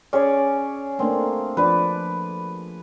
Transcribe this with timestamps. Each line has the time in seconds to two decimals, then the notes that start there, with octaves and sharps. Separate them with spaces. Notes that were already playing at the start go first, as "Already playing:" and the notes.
0.13 C#4 G#4 C#5 D5
0.99 A3 A#3 C4 D4
1.57 F3 D4 B4 D5